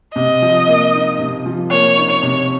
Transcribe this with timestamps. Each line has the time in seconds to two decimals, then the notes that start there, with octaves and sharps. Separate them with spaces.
0.15 C3 D#5
0.42 F3
0.68 A#3
0.94 D#4
1.19 C3
1.46 F3
1.71 A#3 C#5
1.98 D#4
2.10 C#5
2.23 C3